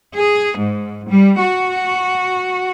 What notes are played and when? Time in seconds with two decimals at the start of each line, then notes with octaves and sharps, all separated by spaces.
0.15 G#4
0.57 G#2
1.10 G3
1.40 F#4